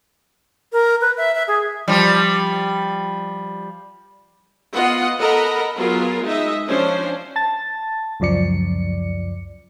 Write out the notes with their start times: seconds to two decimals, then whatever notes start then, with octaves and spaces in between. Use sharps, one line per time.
0.72 A#4
1.01 B4
1.17 E5
1.35 E5
1.48 G#4
1.88 F3 G3
4.73 B3 F4 D#5 F#5
5.19 A4 A#4 D#5 F#5 A#5 B5
5.76 F#3 B3 F4 G#4 A#4
6.22 G#3 D#4 D#5 E5
6.67 F3 C#4 D4 C5
7.36 A5 A6
8.20 C#2 F#2 F3 D5 C#7